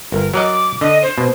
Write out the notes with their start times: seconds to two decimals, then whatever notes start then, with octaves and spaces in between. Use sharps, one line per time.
0.12 G1 A#4
0.34 F#3 A#4 D#5 D6
0.81 D3 D#5
1.02 C5
1.18 B2